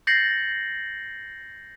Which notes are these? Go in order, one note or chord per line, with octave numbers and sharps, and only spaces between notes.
G6 A6 A#6 C7 C#7 F#7